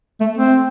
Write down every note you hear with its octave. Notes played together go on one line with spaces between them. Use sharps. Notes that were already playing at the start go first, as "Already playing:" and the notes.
A3
C4